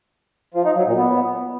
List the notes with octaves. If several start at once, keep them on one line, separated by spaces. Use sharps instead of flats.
F3
D#4
F#3
A#2
B3